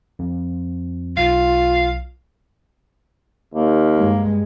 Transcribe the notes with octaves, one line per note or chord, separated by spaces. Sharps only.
F2
B1 F4 F5
D#2 A#3
G2 G#3